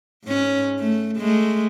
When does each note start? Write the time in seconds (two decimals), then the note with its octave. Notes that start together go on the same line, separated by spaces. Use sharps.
0.24 G#2 C#4
0.80 A3
1.18 G#3 A3